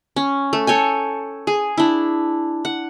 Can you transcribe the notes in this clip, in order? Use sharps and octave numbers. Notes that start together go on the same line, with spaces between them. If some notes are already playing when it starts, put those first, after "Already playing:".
C#4
A3
A4 C#5 G5 G#5
G#4
D4 E4
F#5